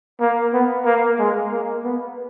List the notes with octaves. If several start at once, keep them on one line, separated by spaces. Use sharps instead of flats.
A#3
B3
A#3
G#3
A#3
B3